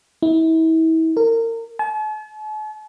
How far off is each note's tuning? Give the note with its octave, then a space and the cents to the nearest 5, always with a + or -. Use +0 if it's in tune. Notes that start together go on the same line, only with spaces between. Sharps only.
E4 -35
A#4 -30
A5 -45